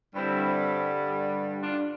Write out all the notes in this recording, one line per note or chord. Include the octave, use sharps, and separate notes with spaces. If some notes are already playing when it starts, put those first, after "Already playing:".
G2 D3 G3 C4 E4
D4 F4